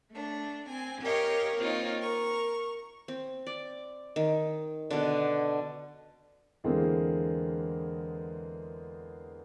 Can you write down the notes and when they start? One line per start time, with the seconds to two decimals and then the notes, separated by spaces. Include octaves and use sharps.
0.11 A3 D4
0.68 C4 G#5
1.03 G4 A#4 C#5 D#5 F5
1.58 A#3 C4 D#4 F4 C#5
2.02 A#4 C#6
3.08 C4
3.47 D5
4.16 D#3
4.91 B2 D3
6.64 E2 D3 E3 G#3 A#3 C4